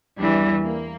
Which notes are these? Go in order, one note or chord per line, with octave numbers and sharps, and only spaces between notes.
E2 E3 G3 D4
A#3